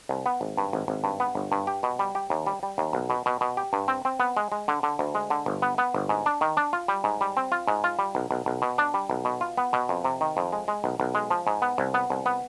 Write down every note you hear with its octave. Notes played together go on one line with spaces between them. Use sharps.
C2
B3
G#1
G2
G#1
G#1
G2
B3
G1
G2
G4
B2
G3
G4
D#2
G3
G3
D#2
B1
B2
B2
B2
G4
G2
C4
C4
B3
G#3
G#3
D3
D3
D2
G#3
D3
G1
B3
B3
G1
G#2
D4
D#3
D4
F4
G3
G#2
G3
C4
F4
G#2
F4
G3
B1
B1
B1
B2
D4
G3
B1
B2
F4
B3
B2
F2
C3
D#3
F2
G#3
G#3
B1
B1
G#3
F3
G#2
B3
C2
B3
C2
B3